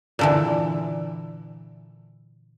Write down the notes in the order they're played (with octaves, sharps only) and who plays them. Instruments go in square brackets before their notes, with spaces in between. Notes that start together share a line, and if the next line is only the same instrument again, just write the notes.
[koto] A#2 D3 E3